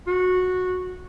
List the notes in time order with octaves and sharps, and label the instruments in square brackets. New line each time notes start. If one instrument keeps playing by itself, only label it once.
[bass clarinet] F#4